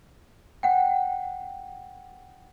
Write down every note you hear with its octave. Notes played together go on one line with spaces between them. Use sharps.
F#5 G5